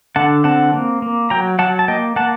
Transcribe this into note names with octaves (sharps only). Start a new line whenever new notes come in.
D3 F#5 A5
C4 F#5 A5
A#3
A#3
F#3 G5 A#5
F#3 F#5 A5
A5
A#3 D#5 G5
A#3 F#5 A5